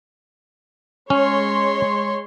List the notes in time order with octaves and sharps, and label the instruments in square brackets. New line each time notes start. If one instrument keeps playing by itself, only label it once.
[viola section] G#3 C#5 C6 [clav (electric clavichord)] C#4